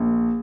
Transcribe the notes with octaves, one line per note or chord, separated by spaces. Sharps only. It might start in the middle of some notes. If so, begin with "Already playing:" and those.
Already playing: A#1